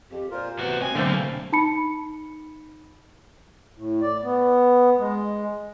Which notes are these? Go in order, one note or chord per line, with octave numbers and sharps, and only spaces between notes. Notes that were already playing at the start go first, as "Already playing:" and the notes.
F2 G4
A#2 F4 A#4 C5
A2 C3 E3 B3 F#4
C4 D#5 G#5
B2 D3 F#3 A3 A#3 C4 F5 G5
D#4 A5 B5 C#7
A2
D5
B3
G#3